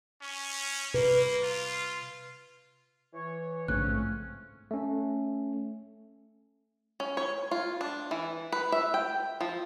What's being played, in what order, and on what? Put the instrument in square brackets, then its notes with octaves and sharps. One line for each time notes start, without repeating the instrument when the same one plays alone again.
[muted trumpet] C#4
[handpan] C3 B4 [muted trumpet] A#3
[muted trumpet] F4
[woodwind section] E3 C#5
[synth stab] A#1 C#3 [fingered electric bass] G#2 A3 [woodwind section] F3 C4 C#4 [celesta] F#6
[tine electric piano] A3 C#4
[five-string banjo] C#4
C#5
F4
D4
E3
B4
E5
G5
F3